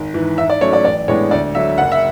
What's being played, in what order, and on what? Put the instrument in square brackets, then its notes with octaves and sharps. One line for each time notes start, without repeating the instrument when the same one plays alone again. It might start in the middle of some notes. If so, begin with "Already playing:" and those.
Already playing: [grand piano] G#1
G#2 E3
G#2 E5
D5
F#3 A3 C#4 C#5
D5
A1 D5
A2 G#3 B3 D4 C#5
D2 D5
D3 F#3 E5
F#1 F#5
E5